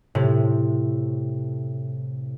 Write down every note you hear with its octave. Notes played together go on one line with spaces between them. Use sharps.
A2 C3